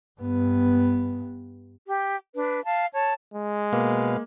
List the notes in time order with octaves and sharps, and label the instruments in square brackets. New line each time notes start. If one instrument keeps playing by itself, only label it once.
[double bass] G2 B3
[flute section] G4
D4 B4
F5 A5
C#5 A5
[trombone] G#3
[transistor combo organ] B2 B4 F5 [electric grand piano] A#3